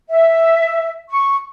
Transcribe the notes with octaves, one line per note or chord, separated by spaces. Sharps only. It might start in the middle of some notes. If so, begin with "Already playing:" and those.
E5
C#6